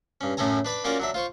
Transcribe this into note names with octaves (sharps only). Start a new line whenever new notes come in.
G2 C#4
F#2 A2 C#4 A4 G#5 A#5
D4 B4 D5 B5
A#3 C#4 F4 F#4 A#4 D5
F#3 D4 E5
F4 C5 C#6